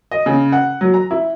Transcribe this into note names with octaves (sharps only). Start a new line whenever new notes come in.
D#5
C#3
F#5
F#3
A#5
E4